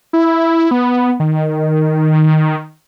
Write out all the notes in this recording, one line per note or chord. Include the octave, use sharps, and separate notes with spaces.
E4
B3
D#3